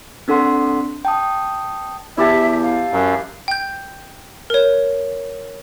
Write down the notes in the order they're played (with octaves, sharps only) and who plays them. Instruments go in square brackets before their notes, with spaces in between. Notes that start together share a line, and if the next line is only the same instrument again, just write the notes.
[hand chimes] C4 D4 A4 F#5 C6
G5 A5 D#6
[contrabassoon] E2 [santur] E4 G4 A5 [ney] E5
[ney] F5
[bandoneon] F#2
[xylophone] G5 G6
A#4 C#5